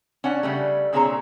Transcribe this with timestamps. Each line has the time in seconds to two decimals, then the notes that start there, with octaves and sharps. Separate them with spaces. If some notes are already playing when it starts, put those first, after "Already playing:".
0.24 C#4 D4 F#5
0.43 C#3 G3 A3
0.93 A#2 D3 C4 G#4 C#5 A#5